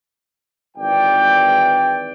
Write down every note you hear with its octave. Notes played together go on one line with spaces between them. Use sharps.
G#1 E3 D5 G5